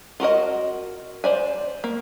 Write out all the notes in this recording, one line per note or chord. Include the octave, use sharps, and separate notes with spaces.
F4 F#4 A#4 D#5
C5 D5 G#5
A#3